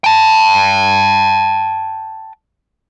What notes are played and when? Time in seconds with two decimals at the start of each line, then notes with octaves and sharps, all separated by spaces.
0.04 G5 A5